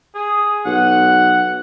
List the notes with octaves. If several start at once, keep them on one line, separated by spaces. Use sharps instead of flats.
G#4
B1 F#5